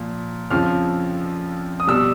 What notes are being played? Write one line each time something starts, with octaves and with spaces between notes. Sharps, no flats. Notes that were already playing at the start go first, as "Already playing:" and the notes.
Already playing: A#2 F3
F2 C#3 F3 F6
D#6
B2 G3 E6